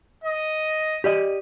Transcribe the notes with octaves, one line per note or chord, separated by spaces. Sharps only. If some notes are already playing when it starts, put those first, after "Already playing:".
D#5
G4 D5 D#5